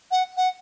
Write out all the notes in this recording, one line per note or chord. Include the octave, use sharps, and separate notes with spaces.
F#5
F#5